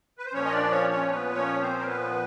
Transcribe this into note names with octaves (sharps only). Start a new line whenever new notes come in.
B4
C5
A#2 F3 C#4 C#5
D#5
D4 D5
C#4 C#5
C#4 C#5
B3 B4
C#4 C#5
C4 C5
A#4
B3 B4